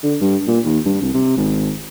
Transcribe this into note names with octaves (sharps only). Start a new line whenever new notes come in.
D3
G2
A#2
D#2
G2
C2
C3
G#1